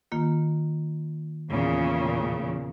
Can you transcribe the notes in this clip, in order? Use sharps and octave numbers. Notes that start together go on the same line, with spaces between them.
D#3 A#3 F4
E2 A#2 C#3